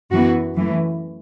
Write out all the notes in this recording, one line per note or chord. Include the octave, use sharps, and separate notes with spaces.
F#2 E3 B3 F#4
F#2 E3 A3